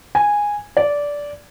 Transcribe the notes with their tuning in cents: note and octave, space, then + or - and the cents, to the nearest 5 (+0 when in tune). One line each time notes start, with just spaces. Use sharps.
G#5 -10
D5 -15